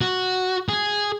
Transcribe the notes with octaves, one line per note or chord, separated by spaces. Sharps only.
F#4
G#4